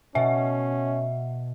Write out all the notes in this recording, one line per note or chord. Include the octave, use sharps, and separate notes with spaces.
B2 C#4 E5